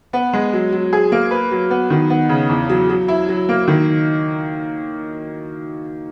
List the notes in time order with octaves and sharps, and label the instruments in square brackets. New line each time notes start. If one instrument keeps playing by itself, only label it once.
[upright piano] B3
G#3
F#3
F#3
G#4
A#3
B4
F#3
B3
D#3
B3
C#3
E2
F#3
F#3
E4
F#3
A#3
D#3